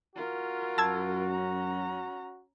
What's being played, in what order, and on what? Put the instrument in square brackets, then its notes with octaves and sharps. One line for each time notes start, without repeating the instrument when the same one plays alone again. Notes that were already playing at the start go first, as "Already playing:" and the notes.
[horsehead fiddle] F4 A#4 [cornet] F#4
[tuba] F#2 [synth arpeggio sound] A5 E6 G#6
[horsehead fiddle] C#4 A#5